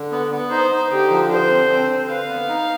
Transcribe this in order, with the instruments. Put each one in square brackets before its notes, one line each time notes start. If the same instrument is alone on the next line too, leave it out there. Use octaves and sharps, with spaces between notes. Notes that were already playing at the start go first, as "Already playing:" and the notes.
Already playing: [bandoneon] D3
B3
B3
[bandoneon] D#4 [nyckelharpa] C5
[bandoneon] D#4
[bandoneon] D3 [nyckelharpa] G4
[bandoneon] F3
[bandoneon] D3 [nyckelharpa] C5
[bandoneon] C4
C4
D3
[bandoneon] B4 [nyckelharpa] F5
[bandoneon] B3
D#4